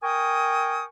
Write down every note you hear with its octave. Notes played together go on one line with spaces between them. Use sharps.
A#4 G5 G#5 C#6 D#6